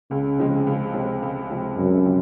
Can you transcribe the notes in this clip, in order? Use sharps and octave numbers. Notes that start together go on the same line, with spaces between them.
C#2 C#3
C3 F3 G#3 C4
C#2
C3 F3 G#3 C4
C#2
C3 F3 G#3 C4
C#2 F#2
C3 F3